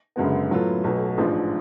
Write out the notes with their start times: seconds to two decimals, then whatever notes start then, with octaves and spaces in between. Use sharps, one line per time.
0.16 F#1 F#2 D3 G#3 B3
0.50 A2 F#3 B3 F4 A4
0.84 B1 B2 F#3 A3
1.18 A1 G#2 F3 G#3 D4